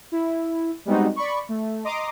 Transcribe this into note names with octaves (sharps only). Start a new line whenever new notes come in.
E4
G3 G#3 B3 C4 D#4 F#4
D5 B5 C#6
A3
D#5 A#5 C6 D6 D#6